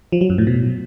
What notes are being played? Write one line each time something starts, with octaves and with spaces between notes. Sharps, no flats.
F3
F#3
F#2
A2
B2